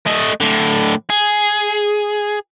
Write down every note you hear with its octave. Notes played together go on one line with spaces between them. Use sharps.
A3 D#5
A2 D3
G#4